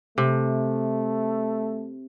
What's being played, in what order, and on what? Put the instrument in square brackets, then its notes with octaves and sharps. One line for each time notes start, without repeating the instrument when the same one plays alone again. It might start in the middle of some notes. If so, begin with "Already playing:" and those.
[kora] C3 [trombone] A3